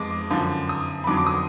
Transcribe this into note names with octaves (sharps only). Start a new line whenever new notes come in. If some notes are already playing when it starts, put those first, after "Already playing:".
Already playing: F2 G#3 D6
F#2 D3 F3
D#6
B5
F2 D3 F#3 D6
D6
D#6